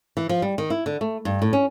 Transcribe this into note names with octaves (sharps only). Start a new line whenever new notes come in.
E3
F3
G3
D#3
E4
D3
A3
G2
A2
C#4